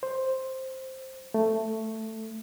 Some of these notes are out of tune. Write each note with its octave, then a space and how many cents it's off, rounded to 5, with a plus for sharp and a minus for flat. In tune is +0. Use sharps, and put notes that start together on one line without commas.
C5 +5
A3 +10